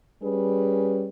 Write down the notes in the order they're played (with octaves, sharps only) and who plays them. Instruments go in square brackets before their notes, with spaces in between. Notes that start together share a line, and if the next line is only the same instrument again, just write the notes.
[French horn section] G3 C#4 G#4 B4